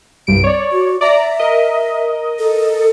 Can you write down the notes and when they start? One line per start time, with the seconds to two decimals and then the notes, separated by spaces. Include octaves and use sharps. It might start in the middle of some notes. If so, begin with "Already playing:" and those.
0.27 C2 G2 D7
0.44 C#5 D5
0.72 F#4
1.01 D5 E5 A#5
1.39 A#4 D#5
2.39 A4